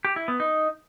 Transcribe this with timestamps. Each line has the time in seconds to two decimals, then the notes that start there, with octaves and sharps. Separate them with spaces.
0.05 G4
0.16 E4
0.28 B3
0.40 D#4